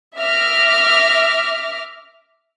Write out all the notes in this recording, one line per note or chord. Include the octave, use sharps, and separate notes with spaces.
E5 D6 F6 A#6